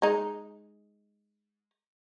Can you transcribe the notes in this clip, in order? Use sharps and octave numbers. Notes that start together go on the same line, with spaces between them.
G#3 D#4